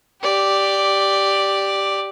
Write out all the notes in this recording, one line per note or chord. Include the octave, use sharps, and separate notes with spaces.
G4 D5